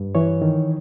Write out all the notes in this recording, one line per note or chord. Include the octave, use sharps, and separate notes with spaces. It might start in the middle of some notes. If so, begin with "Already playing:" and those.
Already playing: G2
E3 C#5
D#3